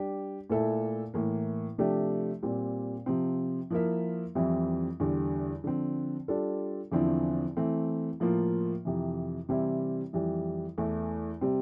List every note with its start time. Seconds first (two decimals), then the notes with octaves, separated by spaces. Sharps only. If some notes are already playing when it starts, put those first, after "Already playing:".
Already playing: G3 D4 G4
0.50 A#2 A3 E4 A4
1.14 A2 E3 A#3
1.78 C3 F3 A3 D4 G4
2.43 A#2 G3 C4
3.06 C3 F3 C4
3.70 F3 A#3 E4 A#4 E5
4.35 F2 E3 G3 C4 E4
5.00 E2 D3 G3
5.64 D3 F3 C4
6.28 G3 D4 F4 A4
6.92 E2 D3 F3 C4 E4
7.57 E3 A3 C4
8.20 A2 F3 A#3 F4
8.85 F2 C3 E3
9.49 C3 E3 G3 C4 E4
10.13 F2 E3 G3
10.78 E2 E3 A3
11.41 C3 G3 C4